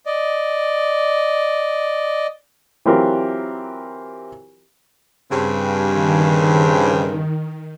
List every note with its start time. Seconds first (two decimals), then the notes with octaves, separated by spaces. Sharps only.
0.06 D5 D#5
2.86 E3 F#3 C4 F4 G4 A#4
5.31 G2 C#3 C4
5.84 D#3